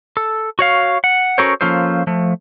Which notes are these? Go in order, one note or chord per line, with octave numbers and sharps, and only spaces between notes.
A4
F#4 C#5 F5
F#5
C#4 F#4 A4 A#4 C5 C#5
F3 A#3 C#4 F4 A4 C5
F3 A3